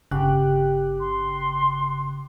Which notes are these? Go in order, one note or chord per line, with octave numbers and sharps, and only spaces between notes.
G1 C#3 G4 F#6
C6